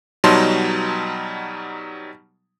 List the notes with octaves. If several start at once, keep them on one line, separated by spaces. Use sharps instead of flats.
B2 F#3 G3 D#4 A5 C6